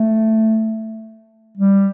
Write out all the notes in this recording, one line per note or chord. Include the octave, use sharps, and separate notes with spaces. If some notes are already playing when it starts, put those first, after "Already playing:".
Already playing: A3
G3